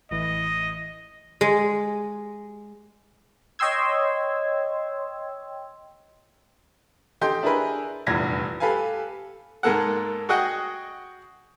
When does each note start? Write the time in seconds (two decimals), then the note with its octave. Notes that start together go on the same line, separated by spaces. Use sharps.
0.11 A1 E3 D#5
1.41 G#3
3.59 C#5 D#5 G5 C6 E6 G#6
7.21 G4 A4 D#5 G5 C6 G6
7.43 D4 E4 G#4 A#4 B4
8.07 F1 A#1 E2 G2 G#6 A#6
8.60 G4 A4 B4 F5 G#5
9.63 G#2 G#3 A#3 A4 F#5
10.29 F#4 G#4 D#5 F#5 G5